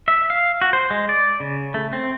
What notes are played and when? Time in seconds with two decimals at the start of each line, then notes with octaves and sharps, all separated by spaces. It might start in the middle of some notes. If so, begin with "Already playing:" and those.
0.08 E5
0.30 F5
0.62 F#4
0.73 C5
0.90 G#3
1.09 D5
1.40 C#3
1.74 A3
1.93 C4